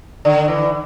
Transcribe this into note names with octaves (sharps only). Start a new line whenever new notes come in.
D3
E3